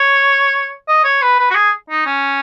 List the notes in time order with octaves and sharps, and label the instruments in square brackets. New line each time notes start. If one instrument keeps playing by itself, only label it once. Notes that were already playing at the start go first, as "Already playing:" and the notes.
Already playing: [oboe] C#5
D#5
C#5
B4
B4
F#4
G#4
D#4
C#4